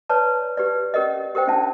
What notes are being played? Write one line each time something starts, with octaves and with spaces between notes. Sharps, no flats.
B4 C#5 D5 A5 A#5
G4 B4 D5
C#4 G4 A#4 D5 D#5
G4 A#4 C5 G5
C#4 D4 E4 F5 A5